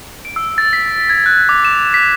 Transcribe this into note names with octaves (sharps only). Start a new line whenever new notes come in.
D7
E6
A6
B6
G#6
F#6
D6
E7
B6